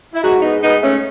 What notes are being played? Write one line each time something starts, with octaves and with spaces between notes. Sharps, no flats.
E4
G#2 D#4 F#4
B3 D#4
G#2 B3 D#4
A3 C#4